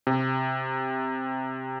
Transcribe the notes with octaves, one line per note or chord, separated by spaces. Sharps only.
C3